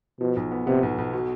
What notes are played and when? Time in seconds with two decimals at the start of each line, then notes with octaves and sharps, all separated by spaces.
0.20 B2 F3
0.36 B1
0.52 B3
0.67 C3 B3
0.83 B1
0.98 B1
1.13 B2